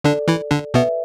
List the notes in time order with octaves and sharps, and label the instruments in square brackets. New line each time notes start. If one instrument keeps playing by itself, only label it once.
[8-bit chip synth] D3 D4 [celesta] A4 D5
[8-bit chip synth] E3 E4
D3 D4
[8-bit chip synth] B2 B3 [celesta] B4 E5